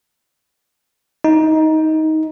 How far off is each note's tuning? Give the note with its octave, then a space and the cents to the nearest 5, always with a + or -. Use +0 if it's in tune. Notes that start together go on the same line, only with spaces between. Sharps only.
D#4 +15